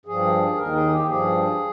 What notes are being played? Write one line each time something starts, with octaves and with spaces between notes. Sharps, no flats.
G2 F3 G#4
D#2 D#3 A#4
G#4
G4
G2 F3 G#4